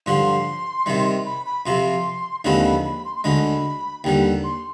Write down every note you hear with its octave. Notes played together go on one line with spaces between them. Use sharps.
G2 D3 F3 C6
C3 D#3 G3
B5
B5
F2 C3 F3 C6
D#2 D3 F3 G#3 C4 B5
B5
B5
C6
C6
D2 D3 G#3 B5
D#2 D3 G3 G5
C6